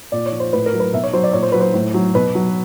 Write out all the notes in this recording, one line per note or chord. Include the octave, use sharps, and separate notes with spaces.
A#2 D5
C#5
F3
C5
A2 B4
A#4
F#3
B4
B2 E5
C#5
F#3 C5
D5
A#2 C#5
C5
F#3 B4
C5
A2
F#3
B2 B4
F#3